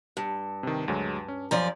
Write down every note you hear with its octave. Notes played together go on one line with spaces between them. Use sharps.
G2
C3 D#3
D2 F#3 G#3
C#4
F#2 F3 D5 A#5